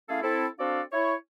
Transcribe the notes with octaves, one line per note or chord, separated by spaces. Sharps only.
A3 C#4 E4 G#4 A4 F5
C4 E4 A4
C4 D4 F#4 A4 D5 F5
E4 C#5